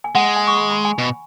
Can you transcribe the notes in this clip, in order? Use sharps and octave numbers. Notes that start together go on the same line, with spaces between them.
G#5
G#3 F#5
G#5
C#6
B5
B5
G#5
B2